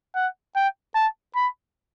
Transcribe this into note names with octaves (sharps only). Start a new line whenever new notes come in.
F#5
G5
A5
B5